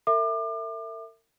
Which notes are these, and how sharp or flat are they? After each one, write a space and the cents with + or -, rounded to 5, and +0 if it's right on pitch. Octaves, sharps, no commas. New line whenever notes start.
A#4 -45 E5 +0 D6 +35